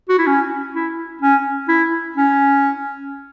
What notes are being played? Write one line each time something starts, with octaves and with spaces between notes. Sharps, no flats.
F#4
E4
C#4
E4
C#4
E4
C#4